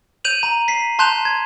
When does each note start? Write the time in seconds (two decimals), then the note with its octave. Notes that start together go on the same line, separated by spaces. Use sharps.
0.24 G6 D#7 F7 F#7
0.43 A#5
0.68 B6 C7
0.99 A5 C6 F#6 G6 E7 F7
1.25 G#6